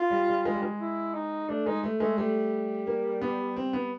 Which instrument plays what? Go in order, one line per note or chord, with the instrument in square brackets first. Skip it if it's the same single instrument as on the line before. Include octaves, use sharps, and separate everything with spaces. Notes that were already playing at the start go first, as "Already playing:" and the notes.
Already playing: [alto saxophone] F4
[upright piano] G3
G3
G#3
G3
G#3
[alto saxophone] E4
D#4
[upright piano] A3 [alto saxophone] D4
[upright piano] G#3 [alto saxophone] D#4
[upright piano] A3
[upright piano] G#3 [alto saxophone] A3
[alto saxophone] G3 [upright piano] A3
[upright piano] A#3
B3
C4
B3